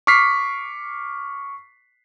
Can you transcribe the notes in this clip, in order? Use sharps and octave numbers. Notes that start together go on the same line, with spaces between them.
C#6 D6 F6 B6 C7